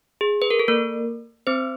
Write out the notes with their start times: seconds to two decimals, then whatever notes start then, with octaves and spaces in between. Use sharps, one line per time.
0.21 G#4
0.42 B4
0.50 A#4
0.59 A4
0.68 A#3 A#4
1.47 C4 C5